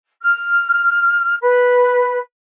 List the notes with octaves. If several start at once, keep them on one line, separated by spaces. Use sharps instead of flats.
F6
B4